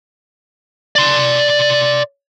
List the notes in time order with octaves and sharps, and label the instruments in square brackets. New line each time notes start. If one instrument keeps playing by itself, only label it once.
[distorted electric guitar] D5 C6